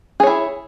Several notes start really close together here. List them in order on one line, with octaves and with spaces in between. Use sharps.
G#4 C#5 E4